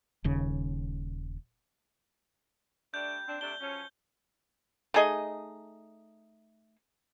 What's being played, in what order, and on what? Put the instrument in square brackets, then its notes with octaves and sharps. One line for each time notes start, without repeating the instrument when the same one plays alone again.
[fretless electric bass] D#1 D#2 C#3
[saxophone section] G3 A3 D4 [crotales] G6
[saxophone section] C4 D4
[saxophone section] C3 A3 D4 [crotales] G7
[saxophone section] F3 F#3 C#4
[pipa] A3 D#4 G#4 D#5